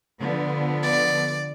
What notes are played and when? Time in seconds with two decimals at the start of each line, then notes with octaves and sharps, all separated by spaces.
0.19 D3 F3 B3
0.82 D5